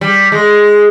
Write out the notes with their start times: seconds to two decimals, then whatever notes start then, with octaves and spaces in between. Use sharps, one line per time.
0.01 G3
0.32 G#3